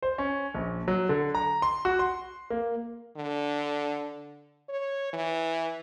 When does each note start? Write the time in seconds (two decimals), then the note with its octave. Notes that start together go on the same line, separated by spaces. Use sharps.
0.02 C5
0.18 C#4
0.54 A#1
0.88 F#3
1.09 D3
1.35 A#5
1.62 C6
1.85 F#4
1.99 C6
2.50 A#3
3.17 D3
4.69 C#5
5.13 E3